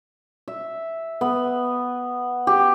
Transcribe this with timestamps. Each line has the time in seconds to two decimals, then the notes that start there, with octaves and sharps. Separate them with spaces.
0.48 E5
1.21 B3
2.47 G4